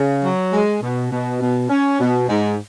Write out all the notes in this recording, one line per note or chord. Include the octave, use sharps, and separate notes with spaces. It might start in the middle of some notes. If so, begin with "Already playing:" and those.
Already playing: C#3
F#3
G#3
B2
B2
B2
C#4
B2
G#2